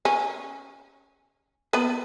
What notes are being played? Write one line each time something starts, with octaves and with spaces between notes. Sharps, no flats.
C#4
B3 B4